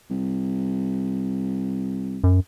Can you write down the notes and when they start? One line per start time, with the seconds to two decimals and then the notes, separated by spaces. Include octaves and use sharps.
0.10 C2
2.24 F#2